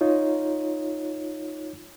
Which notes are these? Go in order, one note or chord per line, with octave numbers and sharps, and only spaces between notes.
D#4 F4 C#5